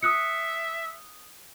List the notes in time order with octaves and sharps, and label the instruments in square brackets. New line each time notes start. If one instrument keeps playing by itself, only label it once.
[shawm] E5 [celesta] D#6 F#6 C#7